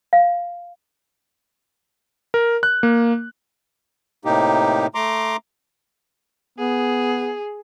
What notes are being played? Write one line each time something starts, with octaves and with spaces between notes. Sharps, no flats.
F5
A#4
F#6
A#3
A2 C3 A#3 D#4 G4
A3 A#5 C6 D6
B3 G#4